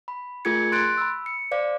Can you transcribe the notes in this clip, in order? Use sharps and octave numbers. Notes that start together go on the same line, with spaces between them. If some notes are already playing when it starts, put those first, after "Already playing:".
B5
A3 F4 G#4 A#4 G#6 C#7
C6 F#6 A6 D7
B5 E6
C#7
C5 D5 F5 D6